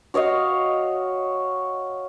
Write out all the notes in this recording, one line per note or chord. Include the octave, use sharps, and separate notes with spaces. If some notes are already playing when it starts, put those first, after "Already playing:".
F#4 C#5 D#5 F5